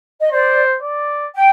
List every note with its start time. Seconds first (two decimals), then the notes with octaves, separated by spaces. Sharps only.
0.20 D#5
0.31 C5 D5
0.82 D5
1.34 G5